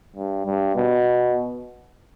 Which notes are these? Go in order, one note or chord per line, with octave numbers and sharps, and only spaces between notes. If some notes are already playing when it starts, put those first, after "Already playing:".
G2
G2
B2